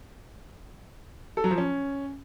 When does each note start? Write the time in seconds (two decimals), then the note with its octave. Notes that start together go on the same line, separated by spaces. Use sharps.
1.37 A4
1.44 F#3
1.51 F3
1.58 C#4